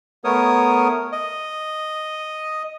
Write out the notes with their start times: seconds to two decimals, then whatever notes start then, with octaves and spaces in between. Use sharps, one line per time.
0.24 A3 B3 A#4 C#5 D#6
1.12 D#5